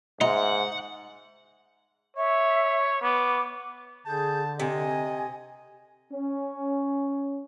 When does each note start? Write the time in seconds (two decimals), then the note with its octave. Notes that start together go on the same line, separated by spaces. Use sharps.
0.21 G#2 D#4 E5 F#5 C6
2.17 C#5 E5
3.02 B3 D6
4.06 D3 G#4 A5 G6
4.60 C3 D#5 G#5
6.13 C#4